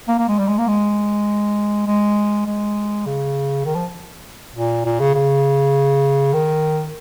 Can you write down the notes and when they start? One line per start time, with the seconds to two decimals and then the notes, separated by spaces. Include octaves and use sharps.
0.08 A#3
0.18 A#3
0.28 G#3
0.39 G3
0.48 G#3
0.58 A#3
0.68 G#3
1.87 G#3
2.46 G#3
3.06 C#3
3.65 D#3
3.75 F3
4.55 A#2
4.85 A#2
5.00 C#3
5.14 C#3
6.33 D#3